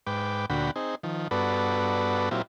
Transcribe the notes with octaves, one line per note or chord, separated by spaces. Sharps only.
G#2 B4 G5 D6
D2 A#2 D3 F#4 G5 B5
C4 D#4 G#4
D#3 F3
G2 B3 F#4 A4 B4 D5
A#2 F#3 C4 E4 F4 G4